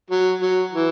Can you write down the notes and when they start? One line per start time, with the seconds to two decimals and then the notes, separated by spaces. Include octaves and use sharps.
0.10 F#3
0.42 F#3
0.73 E3